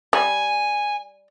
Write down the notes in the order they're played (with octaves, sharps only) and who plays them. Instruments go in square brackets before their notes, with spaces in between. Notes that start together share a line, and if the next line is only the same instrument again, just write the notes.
[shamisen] G3 [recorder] G#5